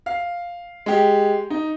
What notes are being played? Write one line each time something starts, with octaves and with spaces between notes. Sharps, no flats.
F5
G#3 G4
D#4